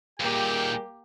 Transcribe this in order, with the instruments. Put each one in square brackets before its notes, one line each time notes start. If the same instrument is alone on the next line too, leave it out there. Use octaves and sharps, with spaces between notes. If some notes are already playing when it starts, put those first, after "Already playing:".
[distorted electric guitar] D#2 A#2 [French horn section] G3 G#4 A#4 [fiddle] A#3 G4 [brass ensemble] G5